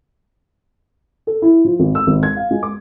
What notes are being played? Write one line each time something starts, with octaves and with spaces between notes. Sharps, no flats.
A4
E4
F3
G#1
E6
G#1
G#6
F5
G#3
D6